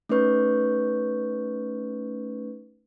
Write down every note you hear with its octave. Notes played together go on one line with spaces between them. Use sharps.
A3 C#4 D#4 B4 C#6 G6